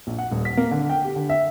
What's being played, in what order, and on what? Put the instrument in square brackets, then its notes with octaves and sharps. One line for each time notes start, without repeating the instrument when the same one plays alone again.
[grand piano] A#1
F#5
D#1
B6
A#3
D3
G5
G4
D3
E5